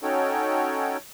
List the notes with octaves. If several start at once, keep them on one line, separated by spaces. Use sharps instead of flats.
C#4 D#4 F#4 A4 C#5 G5